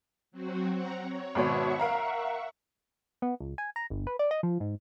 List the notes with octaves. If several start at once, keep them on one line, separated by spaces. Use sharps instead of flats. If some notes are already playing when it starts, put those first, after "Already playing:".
F#3 C4 F#4
C4 F#5 A#5
C#5
G#1 B2 C#5 E5 F#5 C#6
A#4 F5 A#5
B3
C#2
G#5
A#5
G1
B4
D5
D#5
F3
G#2